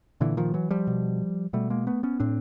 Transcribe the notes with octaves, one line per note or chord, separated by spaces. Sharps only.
A#2 D3 E3
D#3 F3
E3 F#3
F3 G3
B2
B2 G3 A3
G#3 A#3
A3 B3
B3 C#4
A2 C4 D4